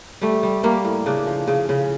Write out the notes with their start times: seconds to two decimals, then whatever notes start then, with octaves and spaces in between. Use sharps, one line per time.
0.21 G3 A3
0.43 G3
0.63 G3 A#3
0.85 A2
1.06 C#3 D4
1.27 F3
1.47 C#3
1.69 C#3